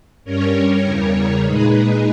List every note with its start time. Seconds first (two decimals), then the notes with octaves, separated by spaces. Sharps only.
0.25 G2 G3 C#4 A#4 C#5
0.54 A#4
0.84 E2 C#3 G3 A#4 C#5
1.14 A#4
1.44 A#2 G#3 D#4 G#4 B4
1.73 G#4 B4